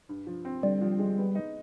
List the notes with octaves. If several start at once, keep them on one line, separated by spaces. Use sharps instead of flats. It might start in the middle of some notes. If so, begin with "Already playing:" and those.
G2
F3
C4
D3 G3
F3
G#3
B3
D#4